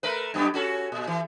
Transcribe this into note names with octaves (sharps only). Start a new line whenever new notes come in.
A3 A#4 B4
F#2 B3 G4
C#4 F#4 A4
A#2
E3